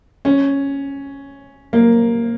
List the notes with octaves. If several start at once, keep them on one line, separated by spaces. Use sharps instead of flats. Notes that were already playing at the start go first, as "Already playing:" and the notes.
C#4
A#3